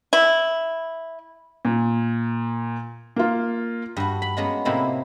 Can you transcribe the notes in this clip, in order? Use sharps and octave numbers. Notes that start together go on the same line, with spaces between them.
E4
A#2
A#3 F4
G2 F#4
B5
G#3 A#3 B3 C#4 A#5
A2 C3 A#3 C4 D#4 E4